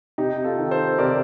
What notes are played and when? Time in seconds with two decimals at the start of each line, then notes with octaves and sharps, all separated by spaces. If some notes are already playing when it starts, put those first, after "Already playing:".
0.18 C3 D#4 G4
0.44 F4 A4
0.58 D#3
0.71 A4 C5
0.98 C3 A#4 D5